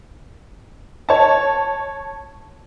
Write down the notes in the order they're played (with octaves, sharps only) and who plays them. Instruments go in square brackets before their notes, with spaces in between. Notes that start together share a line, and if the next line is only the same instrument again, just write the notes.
[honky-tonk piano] C#5 A5